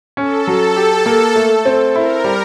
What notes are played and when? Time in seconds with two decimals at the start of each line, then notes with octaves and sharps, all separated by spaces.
0.17 C#4 A4
0.47 F#3
0.76 G4
1.06 A#3
1.36 A3
1.65 C4
1.95 E4 A#4
2.24 G3